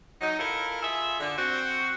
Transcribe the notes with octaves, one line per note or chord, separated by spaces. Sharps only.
F#3 D#4
E4 F4 A4 A#4
F4 G#4 E5
D3
C4 F#4